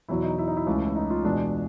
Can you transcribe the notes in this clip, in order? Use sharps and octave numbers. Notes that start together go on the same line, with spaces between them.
E2 B2 F#3 E4
D#4
E4
D#4
E4
C#2 C#3 E3 A3
E4
D#4
F4
E2 B2 G#3 D4